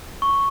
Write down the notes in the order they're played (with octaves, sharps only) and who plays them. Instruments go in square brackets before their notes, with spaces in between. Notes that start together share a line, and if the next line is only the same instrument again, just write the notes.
[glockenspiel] C#6